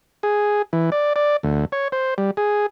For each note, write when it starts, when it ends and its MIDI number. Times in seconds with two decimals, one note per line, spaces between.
0.23 0.62 68
0.73 0.90 52
0.92 1.13 74
1.16 1.37 74
1.43 1.65 38
1.72 1.88 73
1.92 2.14 72
2.18 2.31 55
2.37 2.66 68